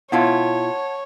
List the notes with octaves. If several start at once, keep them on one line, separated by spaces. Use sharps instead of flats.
B2 E4 F4 C#5 F#5 A5 G#6